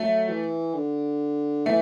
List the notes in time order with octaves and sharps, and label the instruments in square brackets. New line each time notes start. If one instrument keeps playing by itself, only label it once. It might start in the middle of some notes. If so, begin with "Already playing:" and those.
Already playing: [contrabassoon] F#3 [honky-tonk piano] A3
[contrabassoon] E3
D3
[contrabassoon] E3 [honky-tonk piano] A3